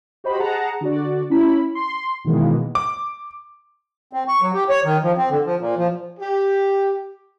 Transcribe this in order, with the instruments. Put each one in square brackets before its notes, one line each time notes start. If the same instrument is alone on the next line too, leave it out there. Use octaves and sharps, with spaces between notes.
[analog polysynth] F#4 G4 C5 D#5 B5
G#4 F#5 A5 A#5
D3 F#4 D5
C#4 E4 B5
C6
B2 D#3 E3 G#3 A#3 B3
[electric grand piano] D6
[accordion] C4
C#6
F#3
G4
C#5
D#3
F3
C4
D3
F3
A#2
F3
[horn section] G4